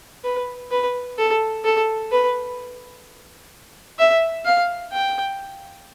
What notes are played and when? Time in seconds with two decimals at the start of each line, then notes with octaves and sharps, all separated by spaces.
0.24 B4
0.71 B4
1.18 A4
1.64 A4
2.12 B4
3.99 E5
4.45 F5
4.93 G5